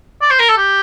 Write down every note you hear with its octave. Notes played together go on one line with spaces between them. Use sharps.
D5
C5
A#4
A4
G4